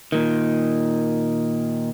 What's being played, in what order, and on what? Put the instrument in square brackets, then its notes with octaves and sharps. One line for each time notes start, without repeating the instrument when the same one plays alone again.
[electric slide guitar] A#2 D#3